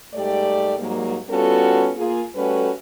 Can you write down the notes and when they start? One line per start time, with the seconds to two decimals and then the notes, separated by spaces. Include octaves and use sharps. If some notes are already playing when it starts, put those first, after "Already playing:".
0.14 G#2 G3 A3 G4 D5
0.78 G#2 F#3 G3 A#3
1.29 G3 B3 C#4 F4 F#4 A4
1.97 A#3 F4 G#4
2.35 G3 A3 C#4 F#4 A4 B4